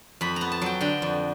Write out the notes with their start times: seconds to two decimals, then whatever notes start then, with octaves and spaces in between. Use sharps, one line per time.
0.21 F2 B5
0.36 B3 A#5
0.52 A5
0.61 F#3 G5
0.81 D3 G5
1.02 F2